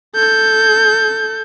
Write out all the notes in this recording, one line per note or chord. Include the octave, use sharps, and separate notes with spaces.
A4 G6